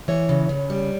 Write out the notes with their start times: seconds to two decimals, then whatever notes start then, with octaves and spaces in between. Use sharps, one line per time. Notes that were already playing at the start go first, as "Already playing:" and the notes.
0.08 E3 C#5
0.29 C#3
0.49 C#3
0.70 G3